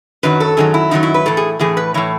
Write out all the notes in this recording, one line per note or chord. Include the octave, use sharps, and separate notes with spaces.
F#2 D#3 F#3 B4
A4
F#2 D#3 F#3 G#4
E4
F#2 D#3 F#3 D#4
E4
B4
A2 E3 A4
G#4
A2 E3 G#4
B4
A2 E3 C#5